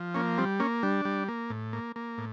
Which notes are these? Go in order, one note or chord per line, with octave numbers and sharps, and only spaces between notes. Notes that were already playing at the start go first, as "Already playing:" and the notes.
Already playing: F3
A#3 C#4
G3 C4
A#3 C#4
G3 D4
G3
A#3
A2
A#3
A#3
A2